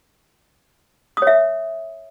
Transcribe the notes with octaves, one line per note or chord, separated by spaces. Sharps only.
C#5 E5 D#6